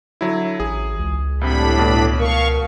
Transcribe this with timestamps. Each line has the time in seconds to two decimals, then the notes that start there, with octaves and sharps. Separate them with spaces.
0.21 D3 F#3 E4
0.60 A1 G#4
0.99 C#2
1.41 C2 A2 C3 D4 B5
1.79 B2
2.19 A#4 F5 C#6